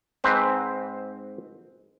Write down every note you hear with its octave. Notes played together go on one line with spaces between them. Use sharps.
G#2 C4 B4